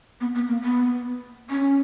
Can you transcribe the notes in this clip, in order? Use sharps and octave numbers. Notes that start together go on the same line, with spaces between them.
B3
B3
A#3
B3
C#4